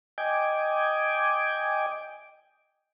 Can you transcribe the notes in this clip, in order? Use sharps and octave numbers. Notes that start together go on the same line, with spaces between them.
D#5 G5 G#5 D6